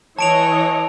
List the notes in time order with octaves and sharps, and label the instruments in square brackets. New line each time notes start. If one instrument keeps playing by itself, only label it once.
[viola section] E3 C#5 D#5 [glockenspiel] A5 D7 F7